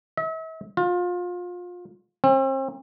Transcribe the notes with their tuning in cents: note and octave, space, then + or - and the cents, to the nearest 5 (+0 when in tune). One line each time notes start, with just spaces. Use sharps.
E5 -40
F4 +30
C4 +40